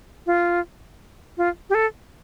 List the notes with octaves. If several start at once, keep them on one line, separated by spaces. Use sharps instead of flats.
F4
F4
G4
A4